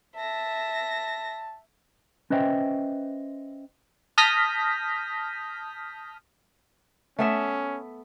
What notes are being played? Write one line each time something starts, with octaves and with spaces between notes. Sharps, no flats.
E5 A5 A#6
C#4 B4 C5 D#5 E5 G5
A5 D#6 F6 G6 A#6 B6
A3 B3 C#4 E5